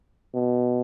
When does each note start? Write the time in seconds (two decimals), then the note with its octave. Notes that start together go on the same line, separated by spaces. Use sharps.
0.34 B2